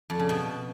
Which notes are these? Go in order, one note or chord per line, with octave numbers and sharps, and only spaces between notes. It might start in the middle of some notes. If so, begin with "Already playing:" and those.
F2
C#3
B2